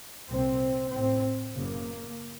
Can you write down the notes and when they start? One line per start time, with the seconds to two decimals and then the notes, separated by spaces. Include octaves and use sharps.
0.29 C2 A#2 C4
0.92 A1 A2 C4
1.55 F#1 F#2 C#3 A#3